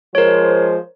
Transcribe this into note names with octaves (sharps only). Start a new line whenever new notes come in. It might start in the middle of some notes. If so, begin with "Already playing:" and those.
F3 G#3 A#4 C5 C#5